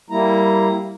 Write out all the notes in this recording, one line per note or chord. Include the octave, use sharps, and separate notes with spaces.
G3 A#3 E4 A#5